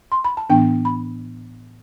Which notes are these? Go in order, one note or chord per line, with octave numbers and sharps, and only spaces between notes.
C6
B5
A5
A2 E3 B3 D4 G5
B5